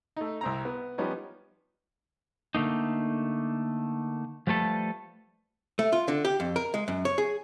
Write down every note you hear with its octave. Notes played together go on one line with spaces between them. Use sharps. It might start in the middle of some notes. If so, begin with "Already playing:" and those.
A3 D#4
C2 C4 A#5
B3
F3 G3 B3 C#4 D#4
D3 A3 A#3 D#4
F3 G3 A3 A4 B4
A3
F4
D3
G4
F2
A#4
G#3
F#2
C#5
G#4